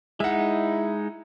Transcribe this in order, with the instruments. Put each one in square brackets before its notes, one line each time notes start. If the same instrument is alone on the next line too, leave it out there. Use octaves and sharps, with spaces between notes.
[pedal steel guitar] G#3 D#4 [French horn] E4 [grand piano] E5 F#5